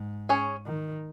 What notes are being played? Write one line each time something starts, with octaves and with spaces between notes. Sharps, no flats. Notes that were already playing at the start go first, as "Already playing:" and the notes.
Already playing: G#2
C#4 G#4 C#5
D#3